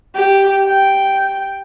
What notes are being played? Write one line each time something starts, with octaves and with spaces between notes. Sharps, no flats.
G4
G5